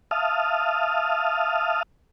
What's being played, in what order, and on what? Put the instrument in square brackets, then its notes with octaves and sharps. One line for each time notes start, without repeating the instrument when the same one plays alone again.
[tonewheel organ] E5 F5 A5 D#6 F6